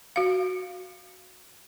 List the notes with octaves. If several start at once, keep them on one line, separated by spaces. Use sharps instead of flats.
F#4 F5